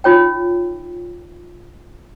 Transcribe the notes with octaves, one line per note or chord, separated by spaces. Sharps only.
D#4 F4 C#5 G5